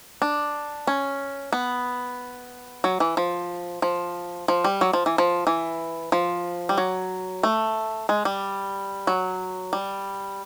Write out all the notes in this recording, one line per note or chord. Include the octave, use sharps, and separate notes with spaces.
D4
C#4
B3
F#3
E3
F3
F3
F3
G3
F#3
F3
E3
F3
E3
F3
G3
F#3
A3
G#3
G3
F#3
G3